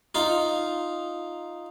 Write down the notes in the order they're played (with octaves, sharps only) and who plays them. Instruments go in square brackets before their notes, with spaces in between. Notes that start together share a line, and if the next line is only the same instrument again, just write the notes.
[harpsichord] D#4 F4